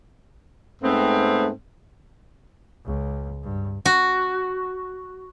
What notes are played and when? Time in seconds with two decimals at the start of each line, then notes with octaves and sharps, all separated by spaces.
0.82 G#2 A3 B3 C4
2.86 C#2
3.43 G2
3.85 F#4